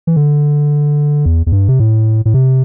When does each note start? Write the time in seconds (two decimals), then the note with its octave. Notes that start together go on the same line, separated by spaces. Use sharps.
0.07 E3
0.16 D3
1.26 E2
1.46 E2
1.52 G2
1.68 C3
1.80 A2
2.25 A2
2.34 C3